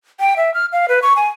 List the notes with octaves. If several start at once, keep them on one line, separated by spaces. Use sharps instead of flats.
G5
E5
F6
F5
B4
C#6
G#5